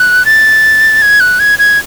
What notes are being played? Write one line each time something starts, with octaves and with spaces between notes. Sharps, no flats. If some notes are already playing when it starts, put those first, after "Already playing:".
Already playing: F#6
A6
G#6
F#6
G#6
G#6